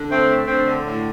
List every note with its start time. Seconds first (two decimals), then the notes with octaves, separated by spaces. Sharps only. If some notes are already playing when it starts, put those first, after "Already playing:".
Already playing: D3
0.10 A3 C4
0.30 A3
0.47 D3 C4
0.67 D3
0.84 A2